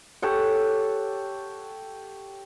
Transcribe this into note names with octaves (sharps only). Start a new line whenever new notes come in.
G4 A4 C#5 F#5